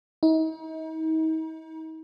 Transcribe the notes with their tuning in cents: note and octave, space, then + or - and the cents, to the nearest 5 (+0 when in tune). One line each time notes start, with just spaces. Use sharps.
D#4 +40